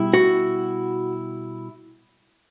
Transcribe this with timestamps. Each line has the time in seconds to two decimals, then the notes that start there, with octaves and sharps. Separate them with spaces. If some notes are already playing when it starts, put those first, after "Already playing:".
Already playing: B2 G3 E4
0.13 F#4